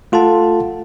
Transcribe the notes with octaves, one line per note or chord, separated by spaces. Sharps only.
A3 F4 A4 F#5 A5